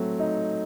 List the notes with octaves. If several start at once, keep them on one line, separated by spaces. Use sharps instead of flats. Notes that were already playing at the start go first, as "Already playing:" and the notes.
Already playing: F#3 A3 C4
D#4